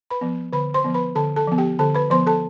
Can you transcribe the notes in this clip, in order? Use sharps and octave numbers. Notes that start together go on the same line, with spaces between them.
B4 B5
F3 B3
D3 B4 B5
C5 C6
F3 B3
B4 B5
D3 A4 A5
A4 A5
F3 B3
G4 G5
D3 A4 A5
B4 B5
F3 B3 C5 C6
A4 A5